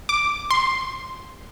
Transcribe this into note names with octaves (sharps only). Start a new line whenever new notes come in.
D6
C6